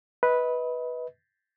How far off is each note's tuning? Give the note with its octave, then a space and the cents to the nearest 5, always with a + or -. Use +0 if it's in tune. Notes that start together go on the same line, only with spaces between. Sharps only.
B4 -5 D#5 +35